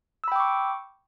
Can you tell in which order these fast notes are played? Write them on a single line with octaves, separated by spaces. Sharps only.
E6 B5 G5 D6 C#6